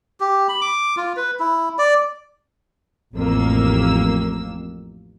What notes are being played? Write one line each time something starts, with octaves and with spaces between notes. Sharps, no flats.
G4
B5
D6
F4
B4
E4
D5
A1 F2 A#3 E6